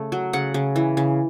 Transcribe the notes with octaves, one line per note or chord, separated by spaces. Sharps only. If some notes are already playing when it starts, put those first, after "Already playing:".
Already playing: C#3 A3
F#3
C#3 F#5
C#3
E3
C#3